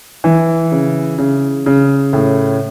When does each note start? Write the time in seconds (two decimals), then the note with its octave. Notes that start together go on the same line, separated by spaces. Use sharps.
0.24 E3
0.72 C#3
1.18 C#3
1.66 C#3
2.13 A2